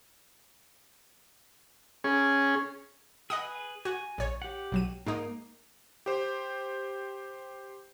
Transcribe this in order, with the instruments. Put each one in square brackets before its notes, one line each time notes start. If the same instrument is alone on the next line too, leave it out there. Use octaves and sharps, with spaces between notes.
[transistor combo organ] C#4 G#4
[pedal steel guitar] G#4 B4 [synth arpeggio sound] D#5 F#5 D#6
[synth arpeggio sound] F#4 [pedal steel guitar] G#5
[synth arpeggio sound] A#1 C#5
[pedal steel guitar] G4 F#5
[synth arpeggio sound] B1 F#3 D#7
[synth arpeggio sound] G#2 G#3 D#4 [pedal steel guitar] A#3
[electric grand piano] G4 C5